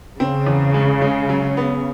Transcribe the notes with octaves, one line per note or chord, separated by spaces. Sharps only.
C#3 C4
E2
G#3
G#3
F#3
B3